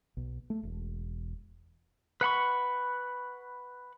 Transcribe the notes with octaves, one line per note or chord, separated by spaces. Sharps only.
B1
A3
E1
B4 F#5 B5 C#6